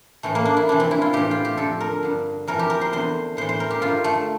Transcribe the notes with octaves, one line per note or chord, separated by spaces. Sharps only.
A2 E3 A3
A#3
D4
E4
F2 C3 E3 D4
C4
E4
F4
A2 E3 G4
F4
G4
F2 D3 A4
A#4
G2 D3
F2 E3 A#4
G4
A#4
C5
E2 D3 C5
A2 E3 C5
C5
A#4
G4
G2 D3 F4
A3